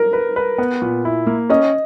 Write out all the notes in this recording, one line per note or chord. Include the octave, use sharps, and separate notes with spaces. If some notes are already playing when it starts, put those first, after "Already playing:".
Already playing: A#4
B4
B4
B3
A#2
E4
A#3
C#4 D#5